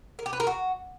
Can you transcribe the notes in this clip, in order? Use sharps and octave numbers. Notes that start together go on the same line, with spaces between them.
A#4
G4
B4
A#4
F#4